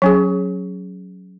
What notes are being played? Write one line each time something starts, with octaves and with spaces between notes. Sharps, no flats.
F#3 C#4 G#4